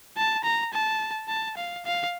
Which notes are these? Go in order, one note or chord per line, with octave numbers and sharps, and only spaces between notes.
A5
A#5
A5
A5
F5
F5